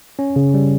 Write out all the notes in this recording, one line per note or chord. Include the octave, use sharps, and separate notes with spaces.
C#4
C#3
G3